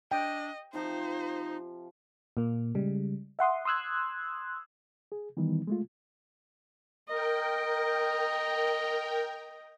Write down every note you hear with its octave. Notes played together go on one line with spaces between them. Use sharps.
D4 D#5 G5
C3 F3 D#4 C5
A#2 A#3
C#3 G3 G#3
E5 F#5 C6 D#6
C6 D#6 E6 F#6 G#6
G#4
D#3 E3 G3 B3 D#4
G#3 A3 F4
A#4 D#5 G5